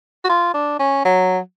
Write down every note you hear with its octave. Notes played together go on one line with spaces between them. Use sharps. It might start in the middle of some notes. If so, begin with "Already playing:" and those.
F#4
F4
D4
C#4
F#3